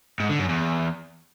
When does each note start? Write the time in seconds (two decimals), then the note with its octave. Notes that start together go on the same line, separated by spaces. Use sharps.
0.20 G#2
0.29 D3
0.39 F#2
0.49 E2